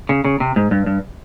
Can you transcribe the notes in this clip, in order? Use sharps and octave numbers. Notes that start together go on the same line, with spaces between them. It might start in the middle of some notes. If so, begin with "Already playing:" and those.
C#3
C#3
C3
G#2
G2
G2